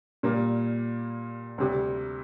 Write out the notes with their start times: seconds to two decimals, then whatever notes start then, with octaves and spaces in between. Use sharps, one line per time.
0.23 A#2 G3 A#3
1.58 D2 C3 G3